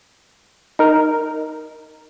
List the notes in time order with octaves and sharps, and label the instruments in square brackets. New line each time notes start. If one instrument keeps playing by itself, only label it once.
[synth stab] D#4 A#4